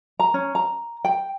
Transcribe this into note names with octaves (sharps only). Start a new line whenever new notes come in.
A#5
C#4
A#5
G5